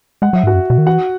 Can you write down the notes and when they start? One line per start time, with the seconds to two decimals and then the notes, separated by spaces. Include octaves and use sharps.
0.22 G#3 F#5
0.33 F#3 E5
0.43 G#2
0.47 F#4 F#5
0.54 F#2
0.70 B2
0.78 D#3
0.86 E3 F#4 F#5